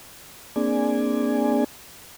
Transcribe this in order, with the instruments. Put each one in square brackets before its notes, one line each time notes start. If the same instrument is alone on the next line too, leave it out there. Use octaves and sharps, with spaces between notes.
[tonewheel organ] A#3 C4 D4 G#4 D5 G#5